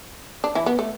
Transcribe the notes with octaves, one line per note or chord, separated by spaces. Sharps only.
D4
E3 E4
B3
A3